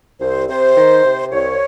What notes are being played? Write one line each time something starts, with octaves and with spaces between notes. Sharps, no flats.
C2 C5
C3 C5
D#3
C3
C2 C#5